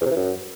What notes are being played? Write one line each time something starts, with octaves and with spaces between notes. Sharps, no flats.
E2
C3
E3
F#2